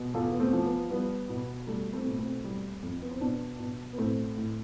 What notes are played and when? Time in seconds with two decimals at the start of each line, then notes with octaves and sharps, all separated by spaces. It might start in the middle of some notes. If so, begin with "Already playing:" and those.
Already playing: B2
0.14 E2 F4 A4
0.32 B3
0.40 A3 C4
0.53 F3
0.66 B3
0.90 G3 B3
1.29 B2
1.67 G3 A3
1.93 A3 C4
2.06 B2
2.18 A3 C4
2.44 G3
2.83 F2
3.02 B3
3.11 C4
3.21 B2 B3 D4
3.60 B2
3.93 B3
3.98 A2 A3 C4
4.37 A2